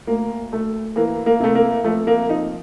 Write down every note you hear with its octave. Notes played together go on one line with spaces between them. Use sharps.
D2 A#3
D2 A3
E3 A#3
A#3
C3 A3
A#3
F3 A3
A#3
F3 D#4